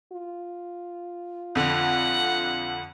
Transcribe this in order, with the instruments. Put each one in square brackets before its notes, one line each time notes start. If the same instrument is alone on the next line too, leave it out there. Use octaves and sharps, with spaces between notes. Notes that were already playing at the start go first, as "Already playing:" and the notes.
[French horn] F4
[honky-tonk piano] F2 D3 [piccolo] F#5